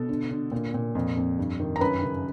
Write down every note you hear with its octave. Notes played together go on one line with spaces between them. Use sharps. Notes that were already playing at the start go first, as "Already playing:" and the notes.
Already playing: B2 A4
D3
D3
A#2
A#2
F2
F2
G2
D#3
A#5
F#2 B4 B5
C#3